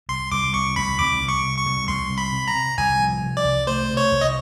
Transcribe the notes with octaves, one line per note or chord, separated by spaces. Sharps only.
C2 C6
C2 D6
C2 C#6
C2 B5
C2 D6
C2
C#6
C3
C#6
C2
C2 C6
C3
B5
C3
A#5
C3
C2 G#5
F3
C3
D5
C2
A3 C5
C3
C#5
C2
D#5